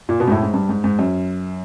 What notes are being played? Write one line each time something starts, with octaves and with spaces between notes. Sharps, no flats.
A#2
B2
G#2
A2
G#2
G2
G#2
G#2
F#2